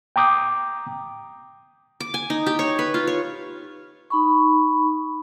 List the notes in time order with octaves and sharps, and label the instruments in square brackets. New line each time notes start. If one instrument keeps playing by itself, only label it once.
[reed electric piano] G5 A#5 D6 D#6 G6
[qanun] D6
G#5
D#4
G4
C#5
B4
F4
C#5
[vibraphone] D#4 B5 C#6